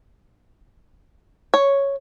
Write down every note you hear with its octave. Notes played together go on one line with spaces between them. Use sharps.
C#5